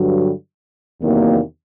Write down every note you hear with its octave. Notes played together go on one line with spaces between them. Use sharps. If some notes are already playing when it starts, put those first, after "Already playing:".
Already playing: G2 D3 F#3
E2 C3 D#3 F#3 A#3